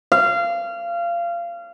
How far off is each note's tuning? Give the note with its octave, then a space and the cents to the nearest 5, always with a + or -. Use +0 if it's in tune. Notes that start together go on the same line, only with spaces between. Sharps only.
F5 -25